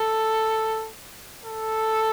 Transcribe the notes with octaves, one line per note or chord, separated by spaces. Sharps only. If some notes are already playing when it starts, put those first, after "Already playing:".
Already playing: A4
A4